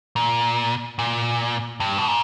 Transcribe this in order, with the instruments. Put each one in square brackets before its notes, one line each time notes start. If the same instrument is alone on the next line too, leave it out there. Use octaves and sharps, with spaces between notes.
[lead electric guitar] A#2
A#2
G2
B2
A#2